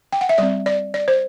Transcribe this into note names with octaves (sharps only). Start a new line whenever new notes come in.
G5
F#5
E5
G3 C4 D5
D5
D5
C5